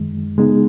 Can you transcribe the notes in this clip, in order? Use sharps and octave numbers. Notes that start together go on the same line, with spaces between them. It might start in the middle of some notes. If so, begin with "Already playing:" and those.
Already playing: F#2 D#3 G#3
C#3 G#3 B3 D#4 G#4